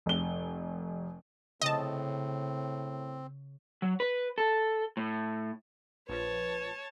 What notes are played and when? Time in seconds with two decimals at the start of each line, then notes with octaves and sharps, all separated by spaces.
0.06 F1 G7
1.61 A2 C#3 C4 D#5 A5
3.82 F#3
4.00 B4
4.38 A4
4.97 A2
6.09 A#1 F3 B4 C#5 A5